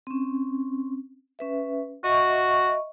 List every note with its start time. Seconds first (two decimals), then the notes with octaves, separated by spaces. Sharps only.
0.07 C4 C#4
1.39 C#4 B4 E5
2.04 F#4 D#5 E5 C#6